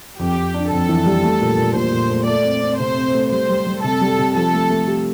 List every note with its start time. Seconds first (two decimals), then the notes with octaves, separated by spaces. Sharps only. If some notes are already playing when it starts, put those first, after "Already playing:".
0.19 F2 G4
0.37 F2
0.54 D4
0.71 F2 A4
0.89 E3
1.06 G3
1.24 A3
1.41 A#2
1.58 A#2
1.75 A#2 C5
1.93 A#2
2.11 A3
2.27 A3 D5
2.45 C4
2.62 C4
2.80 C3 C5
2.97 C4
3.15 A3
3.31 G3 C5
3.49 G3
3.67 G3
3.83 C3 A4
4.01 G3
4.19 C3
4.35 F3 A4
4.53 A3
4.70 A3
4.88 G4